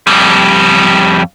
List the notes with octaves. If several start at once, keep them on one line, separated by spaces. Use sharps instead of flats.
F2 G3